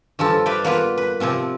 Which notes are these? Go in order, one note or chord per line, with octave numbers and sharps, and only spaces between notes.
G2 F3 F4 A4
B4 D5 E5 F5 G5
A#3 B3 F4 B4
B4
C3 F3 C4 F4